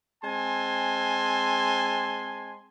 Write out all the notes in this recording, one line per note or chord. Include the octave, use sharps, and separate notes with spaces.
G#3 C4 G#5 A5 C6